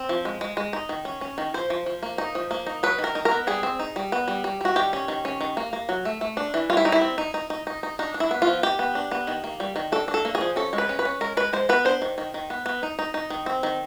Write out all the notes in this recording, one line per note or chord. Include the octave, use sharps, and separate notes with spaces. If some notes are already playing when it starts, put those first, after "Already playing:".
Already playing: C4
F3
G#3
G#3
G#3
D#4
D#3
C#4
C#4
D#3
F3 C5
F3
F3
A#3
D#4
F3
A#3
D#4
F#3 B4
D#3
A#4
D#4
A#4
B3
G3 G#4
C4
D#4
G3
B3
G3
G3
G3 F#4
D#3 G4
C#4
D#3
C#4
D#3
A#3
A#3
F#3
A3
A3
D4
E3
G3 F4
E4
G3 D#4
E4
C4
D#4
D#4
D#4
D#4
D#4
D4 D#4
D4
E4
B3
F4
F3
D#3 G4
B3
D4
B3
D#3
A#3
G3
D#3
D4 A4
D4
A4
A#3
G#4
F3
C#4 A4
G#3
B4
C#4
B4
C#4
G#3 A#4
G#3 B4
G#3 C5
B3 B4
D4 C5
D#3
D#3
D#3
B3
B3
D#4
D#4
D#4
D#3
C4
D#3